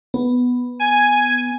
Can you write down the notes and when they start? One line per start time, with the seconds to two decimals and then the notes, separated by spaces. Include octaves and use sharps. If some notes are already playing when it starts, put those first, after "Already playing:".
0.14 B3
0.80 G#5